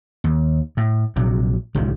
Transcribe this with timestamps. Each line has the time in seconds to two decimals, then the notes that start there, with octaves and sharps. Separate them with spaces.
0.24 D#2
0.77 A2
1.16 A#1 C3 F#3
1.75 D1 C2 D#3 G#3